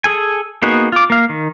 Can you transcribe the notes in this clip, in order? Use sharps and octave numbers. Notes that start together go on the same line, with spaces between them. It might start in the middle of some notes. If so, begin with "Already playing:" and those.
G#4 A4 G#5
A#3 B3 D#4 F#4 G#4
F4 D6
A#3 F5
D#3